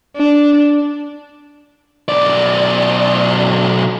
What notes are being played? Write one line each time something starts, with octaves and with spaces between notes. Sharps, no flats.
D4
B1 D5